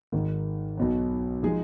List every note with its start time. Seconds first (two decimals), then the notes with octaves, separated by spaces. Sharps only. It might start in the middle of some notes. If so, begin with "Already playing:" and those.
0.12 G#1 G#2 D#3
0.77 B1 B2 F#3
1.43 F3 G#3 D#4 G#4